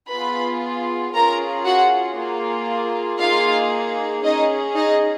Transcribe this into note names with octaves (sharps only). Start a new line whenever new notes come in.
B3 F4 G#4 B4 B5
C#4 F4 G#4 A#4 A#5
F#4 F#5
A#3 F4 G#4
A#3 D#4 F4 G#4 F5
C#4 D#4 G#4 D#5
D#4 D#5